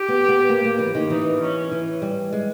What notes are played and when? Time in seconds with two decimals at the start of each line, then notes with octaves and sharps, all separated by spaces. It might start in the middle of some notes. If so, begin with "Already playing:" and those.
Already playing: G4
0.08 B3
0.29 B3
0.49 A#3
0.65 A#3
0.79 E3
0.95 D#3
1.10 E3 D#4
1.41 C#4
1.71 E3
2.02 G3
2.33 G#3